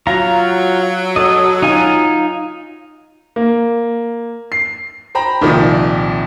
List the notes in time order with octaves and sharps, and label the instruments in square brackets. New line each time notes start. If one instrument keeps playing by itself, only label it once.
[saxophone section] F#3 [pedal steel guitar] F4 A#5
[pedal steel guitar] A4 D#5
D#4 F4 G#5
[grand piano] A#3
C7
[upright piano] C5 G5 A#5 B5
C2 A#2 D#3 F3